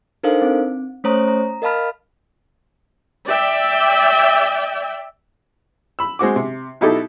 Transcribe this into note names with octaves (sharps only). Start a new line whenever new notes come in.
D4 D#4 A4 A#4 C5 F5
C4
A3 C#4 C5 C#5 A#5 D#6
A#5
A#4 D#5 F5 A5 B5 F6
D5 E5 G5
B5 E6
G#3 C4 F#4 D6
C3
B2 D#4 E4 G4 A4